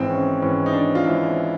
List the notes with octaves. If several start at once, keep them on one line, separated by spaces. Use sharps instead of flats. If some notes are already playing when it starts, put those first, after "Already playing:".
Already playing: G#1 G#2 E3 C4
C#4
G#1 G#2 E3 C#4
D#4
D4
F4
G#1 G#2 E3 E4